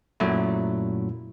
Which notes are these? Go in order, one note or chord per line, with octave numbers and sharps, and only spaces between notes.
F#2 A#2 F#3 A3 E4